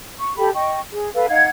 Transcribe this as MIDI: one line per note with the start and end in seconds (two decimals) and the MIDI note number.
0.19 0.33 85
0.37 0.50 67
0.37 0.50 69
0.37 0.50 83
0.54 0.79 75
0.54 0.79 79
0.54 0.79 85
0.92 1.10 68
1.14 1.26 69
1.14 1.26 71
1.14 1.26 77
1.29 1.48 63
1.29 1.48 77
1.29 1.48 78
1.29 1.48 92